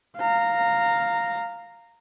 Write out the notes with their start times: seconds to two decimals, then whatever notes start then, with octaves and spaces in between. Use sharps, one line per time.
0.17 F5 A#5